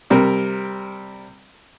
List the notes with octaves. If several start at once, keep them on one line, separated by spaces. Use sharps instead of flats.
C3 G3 A#4